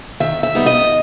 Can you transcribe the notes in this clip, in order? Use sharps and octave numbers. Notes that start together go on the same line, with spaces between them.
D#3 E5
E5
G3 B3 D#4
D#5